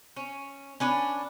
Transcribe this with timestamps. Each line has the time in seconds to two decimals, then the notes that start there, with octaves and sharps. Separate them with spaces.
0.16 C#4
0.80 C#4 D4 B4